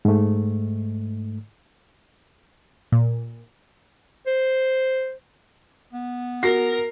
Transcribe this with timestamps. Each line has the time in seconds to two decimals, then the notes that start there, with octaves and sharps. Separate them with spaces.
0.05 G#2 A3
2.92 A#2
4.27 C5
5.93 B3
6.43 F#4 A#4 A#6 C7